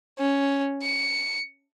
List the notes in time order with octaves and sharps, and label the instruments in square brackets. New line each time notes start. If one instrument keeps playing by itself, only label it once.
[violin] C#4
C#7